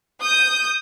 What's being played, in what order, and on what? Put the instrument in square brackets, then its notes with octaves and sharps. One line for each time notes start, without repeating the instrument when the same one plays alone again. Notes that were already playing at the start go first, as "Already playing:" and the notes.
[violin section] D#6 G6